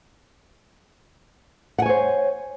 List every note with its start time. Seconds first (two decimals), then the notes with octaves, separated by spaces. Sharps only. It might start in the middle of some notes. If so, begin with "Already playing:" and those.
1.78 F#5
1.82 G#5
1.86 C#5
1.89 C5